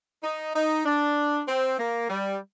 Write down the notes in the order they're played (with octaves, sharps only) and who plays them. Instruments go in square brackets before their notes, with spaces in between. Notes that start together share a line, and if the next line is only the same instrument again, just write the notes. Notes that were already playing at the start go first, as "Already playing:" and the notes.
[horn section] D#4
D#4
D4
C4
A#3
G3